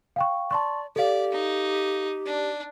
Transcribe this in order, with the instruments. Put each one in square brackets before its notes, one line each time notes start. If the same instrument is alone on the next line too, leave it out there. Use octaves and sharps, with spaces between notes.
[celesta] F5 G5 C#6
[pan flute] D5 [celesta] A5 C6 C#6
[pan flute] G4 [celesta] A4 F5 [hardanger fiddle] D5
[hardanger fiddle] D#4
D4